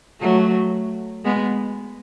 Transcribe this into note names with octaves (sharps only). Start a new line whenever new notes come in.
F#3 A3
G#3 B3